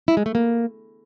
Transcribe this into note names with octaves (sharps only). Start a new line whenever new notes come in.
E4
G#3
A3
A#3